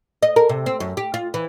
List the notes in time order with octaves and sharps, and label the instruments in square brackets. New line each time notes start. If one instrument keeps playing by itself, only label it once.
[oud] D#5
A#4
C3
C4
F#2
G4
F4
E3